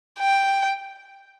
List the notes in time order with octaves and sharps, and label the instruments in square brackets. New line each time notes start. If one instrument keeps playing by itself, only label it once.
[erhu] G5